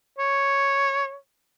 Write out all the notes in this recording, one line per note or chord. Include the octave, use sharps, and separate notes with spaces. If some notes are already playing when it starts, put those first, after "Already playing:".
C#5